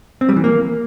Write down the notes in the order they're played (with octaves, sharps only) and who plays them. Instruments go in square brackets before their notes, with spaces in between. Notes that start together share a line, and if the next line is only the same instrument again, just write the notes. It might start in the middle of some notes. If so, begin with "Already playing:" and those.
[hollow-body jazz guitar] C4
G3
E3
A#3